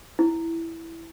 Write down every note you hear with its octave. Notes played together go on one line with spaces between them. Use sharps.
E4